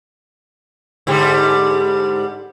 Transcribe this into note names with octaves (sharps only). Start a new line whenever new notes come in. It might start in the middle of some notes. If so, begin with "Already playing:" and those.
G#2 D3 G3